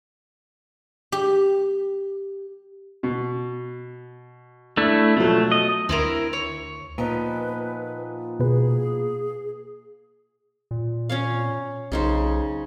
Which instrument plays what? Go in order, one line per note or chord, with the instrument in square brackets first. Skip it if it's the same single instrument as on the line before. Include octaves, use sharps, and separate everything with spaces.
[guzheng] G4
[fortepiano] B2
[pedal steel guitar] A3 D4 E4
[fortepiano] B2 F3 F#3 [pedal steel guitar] A3
[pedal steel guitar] D#5
[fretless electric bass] D2 [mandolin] C4 E4 A#4
[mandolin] C#5
[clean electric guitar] A#2 [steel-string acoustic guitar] F3 B3 D#4 [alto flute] B4
[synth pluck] B2 B4 [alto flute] G#4
[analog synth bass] A#2
[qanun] C#4 C#5 F5
[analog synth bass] B1 [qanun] C#3 D#4 C5